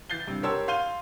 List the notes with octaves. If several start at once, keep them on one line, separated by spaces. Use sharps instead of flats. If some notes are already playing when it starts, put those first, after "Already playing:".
E3 G6 A6 C7 G7
G2 C3
G4 A#4 C#5 A5 C6 E6
F5 C6 G6 D#7 G7